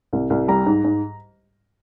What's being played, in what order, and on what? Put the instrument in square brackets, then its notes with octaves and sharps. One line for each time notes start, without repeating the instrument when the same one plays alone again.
[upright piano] C2
C2
G3 A#5
G#2
G#2